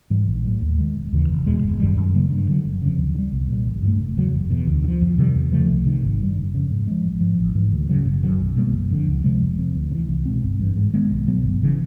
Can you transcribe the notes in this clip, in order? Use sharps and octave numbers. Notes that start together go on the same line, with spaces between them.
G#2 E3 G3
A#1
A2 F#3
D#2
D#3 G#3
E1
D#2 C#3 E3
F1
E2 B2 G#3
G1
F#2 D#3 G3
F#2
C#3 F#3 A#3
G2
D3 F#3
F#1
F2 C#3
D2
D3
G3
C2
A#2 G3
A1
G2 E3
A3
F1
E2 C#3 F#3
F#1
E2 B2
D2
D3
F3
F2
C3 D#3 G3
E2
C#3 F3 A3
C2
C3 D#3
G#1
G2 E3 G3
F#1
F2 C#3
G#2
F3 G#3
A1
G#2 F3
A1
G#2 E3
D2
C#3 F#3
F#1
F#2 D#3 F#3
B1
B2 G3 A#3
F#1
F2 D3
C#2
C3 F3 G#3
F1
F2 C3
D2
C#3
E3
C2
B2 G#3 C4
G1
G2 E3
G#2
D#3 G#3 B3
B1
B2 F#3 B3
G1
C#3 E3